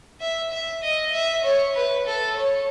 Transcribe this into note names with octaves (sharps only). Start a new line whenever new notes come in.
E5
E5
D#5
E5
C#5
B4
A4
C#5